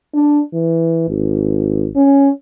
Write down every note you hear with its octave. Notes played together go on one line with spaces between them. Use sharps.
D4
E3
G#1
C#4